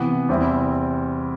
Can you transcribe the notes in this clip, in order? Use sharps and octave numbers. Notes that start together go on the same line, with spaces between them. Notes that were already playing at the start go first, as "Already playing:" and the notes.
Already playing: C3 E3 B3
E2 C3 G3 C4 E4